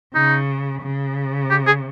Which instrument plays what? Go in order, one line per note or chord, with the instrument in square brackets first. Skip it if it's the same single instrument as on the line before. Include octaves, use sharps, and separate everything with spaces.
[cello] C#3 [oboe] D#4
[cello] C#3
[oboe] G4
G#4